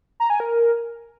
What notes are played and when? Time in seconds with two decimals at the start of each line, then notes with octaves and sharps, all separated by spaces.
0.20 A#5
0.30 G#5
0.40 A#4